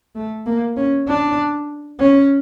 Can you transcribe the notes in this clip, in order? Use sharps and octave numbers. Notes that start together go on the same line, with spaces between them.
A3
A#3
C#4
D4
C#4